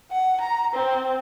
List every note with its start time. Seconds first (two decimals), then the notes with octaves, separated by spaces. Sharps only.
0.11 F#5
0.41 A#5
0.73 C4